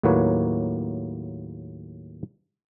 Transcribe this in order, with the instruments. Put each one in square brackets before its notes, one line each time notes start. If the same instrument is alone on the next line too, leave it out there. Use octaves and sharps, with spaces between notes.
[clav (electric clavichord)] D#2 A2 F#3 A#3 B4 C#5